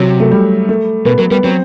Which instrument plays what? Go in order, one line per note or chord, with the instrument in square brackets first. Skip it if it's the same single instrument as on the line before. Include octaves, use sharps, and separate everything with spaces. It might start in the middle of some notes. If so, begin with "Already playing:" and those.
Already playing: [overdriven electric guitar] C3 [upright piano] F#3
[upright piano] A3
G3
A3
[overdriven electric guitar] B2 [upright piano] B3
[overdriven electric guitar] F#3 [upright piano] B3
[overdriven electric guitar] G3 [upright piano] B3
[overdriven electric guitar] F#3 [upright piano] C4